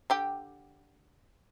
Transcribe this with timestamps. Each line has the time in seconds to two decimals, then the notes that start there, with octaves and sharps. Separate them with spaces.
0.10 D3 G4 G5